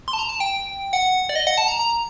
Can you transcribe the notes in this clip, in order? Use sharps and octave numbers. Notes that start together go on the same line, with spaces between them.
C6
A5
A#5
A5
G5
F#5
D5
D#5
F#5
A5
A#5
A#5